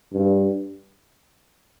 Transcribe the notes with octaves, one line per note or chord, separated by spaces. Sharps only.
G2